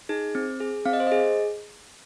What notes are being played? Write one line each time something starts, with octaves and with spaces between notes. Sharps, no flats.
D#4 G#4
C4
G#4
C4 F5
D#5
C5
D#5
G#4